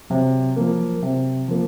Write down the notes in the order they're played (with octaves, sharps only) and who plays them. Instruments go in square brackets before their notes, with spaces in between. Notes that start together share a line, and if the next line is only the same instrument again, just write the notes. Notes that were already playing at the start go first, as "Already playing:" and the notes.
[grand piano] C3 [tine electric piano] F#3
[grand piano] F3 A#3
[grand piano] C3 [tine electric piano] F#3
[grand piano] F3 A#3